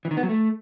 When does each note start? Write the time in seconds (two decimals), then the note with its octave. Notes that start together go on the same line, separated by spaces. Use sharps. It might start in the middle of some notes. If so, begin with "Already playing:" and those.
0.05 E3
0.11 D#3
0.17 B3
0.23 F#3
0.29 A3